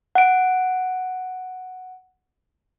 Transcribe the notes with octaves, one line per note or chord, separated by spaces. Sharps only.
F#5 D7